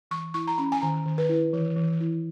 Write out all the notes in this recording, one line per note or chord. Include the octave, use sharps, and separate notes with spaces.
E3 C#6
E4 C#6
A#5
C#4 B5
G#5
D#3 A#5
D#3
B4
E4
E3
E3
E4